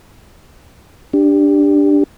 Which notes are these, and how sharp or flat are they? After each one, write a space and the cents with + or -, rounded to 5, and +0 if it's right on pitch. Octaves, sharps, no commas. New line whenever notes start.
D4 +0 G4 +10